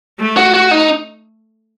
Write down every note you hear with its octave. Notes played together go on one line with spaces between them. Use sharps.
A3
F#4
F#4
D#4